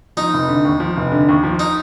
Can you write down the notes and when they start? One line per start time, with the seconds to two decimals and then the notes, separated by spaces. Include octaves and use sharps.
0.17 F3 D#4
0.33 F1
0.48 D3
0.65 D#2
0.80 F3
0.97 F1
1.12 D3
1.29 D#2
1.43 F3
1.59 D#4